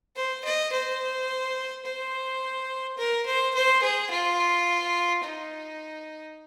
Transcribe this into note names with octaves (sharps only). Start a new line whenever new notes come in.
C5
D#5
C5
C5
A#4
C5
C5
G#4
F4
D#4